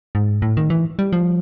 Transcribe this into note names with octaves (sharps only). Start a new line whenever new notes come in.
G#2
A2
D#3
E3
G3
F3